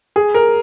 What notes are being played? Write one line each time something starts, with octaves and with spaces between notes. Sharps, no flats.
G#4
A#4